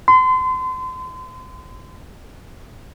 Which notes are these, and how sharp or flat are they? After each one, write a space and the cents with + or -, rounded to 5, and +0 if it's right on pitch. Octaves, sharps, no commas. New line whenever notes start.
C6 -35